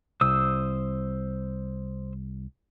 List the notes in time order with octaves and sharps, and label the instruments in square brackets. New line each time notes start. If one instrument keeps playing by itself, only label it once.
[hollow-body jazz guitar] C2 [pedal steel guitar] C5 D#6 E6